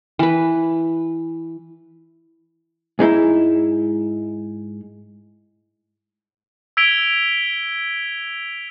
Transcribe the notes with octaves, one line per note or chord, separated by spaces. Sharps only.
E3 B4
G#2 G#3 D#4 E4
E6 G#6 B6 D7 F7 G7